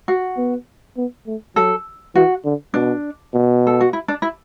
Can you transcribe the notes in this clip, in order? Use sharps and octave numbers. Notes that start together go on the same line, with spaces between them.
F#4
B3
B3
A3
F#3 A4
E3 F#4
D3
B2 D4
B2
A4
F#4
E4
D4
E4